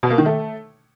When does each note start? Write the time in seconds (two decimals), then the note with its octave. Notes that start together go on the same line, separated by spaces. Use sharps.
0.03 B2
0.11 A#3
0.18 D#3
0.26 A3